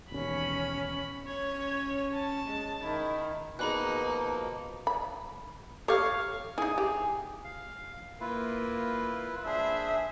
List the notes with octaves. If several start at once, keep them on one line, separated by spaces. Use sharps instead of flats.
E1 D#2 C#4 B5
C#4 C#5
A5
G#3
D#3 E4
B2 F3 A#3 D#4 G#4 B5 F#6
B5
G4 A4 C#5 F5
D#4 E4 G#4
G4
F5
A#3 E4 F4 B4
D4 G#4 C5 E5